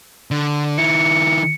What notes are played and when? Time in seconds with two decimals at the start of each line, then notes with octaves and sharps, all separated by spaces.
0.31 D3
0.78 D#3 E4 C#7